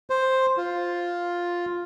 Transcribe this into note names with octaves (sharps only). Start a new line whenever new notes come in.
C5
F4